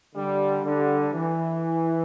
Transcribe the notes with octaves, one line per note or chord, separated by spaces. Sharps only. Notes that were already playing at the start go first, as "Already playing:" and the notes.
D3 G3
D3 G3
E3